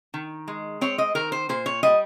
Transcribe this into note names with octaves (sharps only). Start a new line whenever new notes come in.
D#3
G#3
C4 C#5
D#5
D#3 A#4
C5
A#2 C5
C#5
G3 D#5